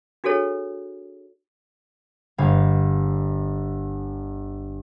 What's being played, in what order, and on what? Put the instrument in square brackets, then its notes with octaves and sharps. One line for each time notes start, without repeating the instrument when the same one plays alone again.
[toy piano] D4 F#4 G#4 A4 C#5
[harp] G1 F5 G#6